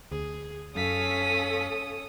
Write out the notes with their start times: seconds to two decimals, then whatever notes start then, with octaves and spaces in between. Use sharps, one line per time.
0.12 D2 G#4
0.76 F#2 C#4 A4 C#5 F5 D#6 B6